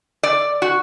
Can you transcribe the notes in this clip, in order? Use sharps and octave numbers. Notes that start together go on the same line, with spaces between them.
D5
F#4